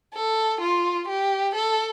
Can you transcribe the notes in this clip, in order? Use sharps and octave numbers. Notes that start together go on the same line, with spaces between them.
A4
F4
G4
A4